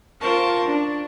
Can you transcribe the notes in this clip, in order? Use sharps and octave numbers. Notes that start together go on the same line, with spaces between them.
F4 A#4 C5 A5 C#6
D4